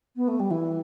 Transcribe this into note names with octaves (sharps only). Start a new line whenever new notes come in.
B3
A3
G3
E3